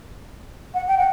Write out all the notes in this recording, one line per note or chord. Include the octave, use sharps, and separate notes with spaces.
F#5
G5
F#5